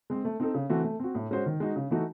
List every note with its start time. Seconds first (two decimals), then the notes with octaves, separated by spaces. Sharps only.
0.10 G#3 C4
0.25 A3
0.40 C4 D#4 A4
0.54 C#3
0.69 E3 A3 C4 F#4
0.84 A3
1.00 C4 F#4
1.15 A2
1.31 G#3 C#4 F#4 C5
1.46 D#3
1.60 G#3 D#4 F#4
1.76 C#3
1.91 E3 A3 D#4 F#4